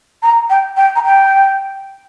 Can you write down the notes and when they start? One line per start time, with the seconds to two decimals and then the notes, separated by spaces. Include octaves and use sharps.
0.22 A#5
0.50 G5
0.77 G5
0.96 A#5
1.04 G5